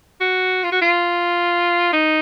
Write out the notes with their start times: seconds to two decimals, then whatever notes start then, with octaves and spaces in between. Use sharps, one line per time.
0.20 F#4
0.64 F4
0.72 F#4
0.81 F4
1.93 D#4